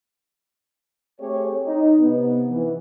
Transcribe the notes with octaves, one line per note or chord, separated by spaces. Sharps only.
A3 C4 G4 G#4 C#5
D#4
C3 B3
E3